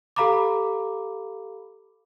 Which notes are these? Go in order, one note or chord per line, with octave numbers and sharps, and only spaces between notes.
G4 A4 F5 A#5 B5 D6